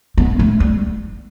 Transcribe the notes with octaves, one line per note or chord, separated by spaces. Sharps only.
B3
A3
G3